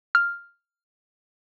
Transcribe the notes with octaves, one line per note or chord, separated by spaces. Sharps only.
F6